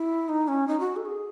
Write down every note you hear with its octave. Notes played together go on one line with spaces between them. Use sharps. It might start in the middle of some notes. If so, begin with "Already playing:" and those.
Already playing: E4
D#4
C#4
D#4
F#4
A4
G#4